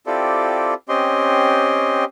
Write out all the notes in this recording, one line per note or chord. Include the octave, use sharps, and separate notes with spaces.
C4 E4 F4 G4 A4 D5
C4 C#4 G4 D#5 C6